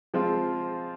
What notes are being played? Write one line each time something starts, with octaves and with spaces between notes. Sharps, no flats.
F3 G#3 C4 F4